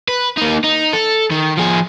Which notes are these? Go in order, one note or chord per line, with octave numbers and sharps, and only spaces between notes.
B4
A#3 D#4
D#4
A4
D#3
F3 G#4